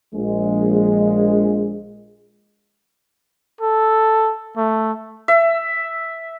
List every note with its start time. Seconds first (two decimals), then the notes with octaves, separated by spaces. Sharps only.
0.14 A#1 G#3
3.61 A4
4.57 A3
5.28 E5